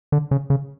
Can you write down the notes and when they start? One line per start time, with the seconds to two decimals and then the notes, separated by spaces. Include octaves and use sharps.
0.12 D3
0.31 C#3
0.50 C#3